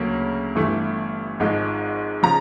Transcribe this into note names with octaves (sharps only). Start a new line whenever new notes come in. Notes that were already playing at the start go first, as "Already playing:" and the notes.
Already playing: D2 C#3 F#3 A#3 C#4
G1 G2 E3 A3
G#1 G#2 F3 G#3
C#3 F3 A#5